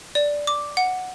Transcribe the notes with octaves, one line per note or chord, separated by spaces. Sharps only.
D5
D6
F#5